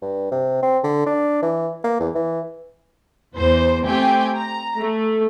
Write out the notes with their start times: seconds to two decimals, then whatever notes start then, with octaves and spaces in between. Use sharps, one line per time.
0.02 G2
0.32 C3
0.62 C4
0.84 D3
1.06 D4
1.42 E3
1.84 A#3
2.00 E2
2.15 E3
3.35 E2 C5
3.85 A3 C4 G4 G5 G#5
4.38 A#5
4.79 A3